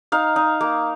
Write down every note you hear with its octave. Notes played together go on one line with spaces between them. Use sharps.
D#4 F5
D#4
A#3